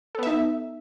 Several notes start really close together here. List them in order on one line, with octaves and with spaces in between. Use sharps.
A4 B3 E5 D#4